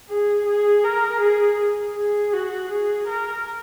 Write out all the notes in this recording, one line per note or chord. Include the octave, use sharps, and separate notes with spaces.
G#4
G#4
A#4
G#4
G#4
F#4
G#4
A#4